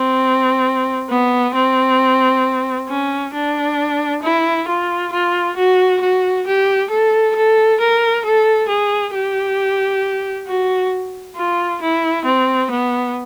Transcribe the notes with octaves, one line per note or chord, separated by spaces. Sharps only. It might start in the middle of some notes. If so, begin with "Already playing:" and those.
Already playing: C4
B3
C4
C#4
D4
E4
F4
F4
F#4
F#4
G4
A4
A4
A#4
A4
G#4
G4
F#4
F4
E4
C4
B3